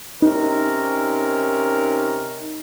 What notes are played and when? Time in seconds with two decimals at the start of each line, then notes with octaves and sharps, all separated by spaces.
0.22 C3 C#4 D#4 A#4